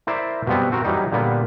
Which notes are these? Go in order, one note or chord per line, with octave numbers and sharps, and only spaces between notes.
E4 A#4 C5 D5 E5
B2 F3 G3 B3 C4
C4 F#4 A#4
E3 F#3 G3 D#4
A#2 D3 G3 A#3 B3